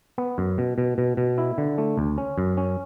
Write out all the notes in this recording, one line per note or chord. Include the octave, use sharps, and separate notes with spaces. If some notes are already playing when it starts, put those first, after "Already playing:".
B3
F#2
B2
B2
B2
B2
E4
D3
A3
D2
C#4
F#2
C#4